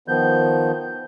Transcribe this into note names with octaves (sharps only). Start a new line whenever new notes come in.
D#3 F3 B3 G6